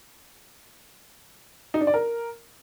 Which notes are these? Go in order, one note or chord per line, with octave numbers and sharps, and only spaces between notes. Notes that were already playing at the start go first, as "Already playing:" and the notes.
D#4
D4
D5
A#4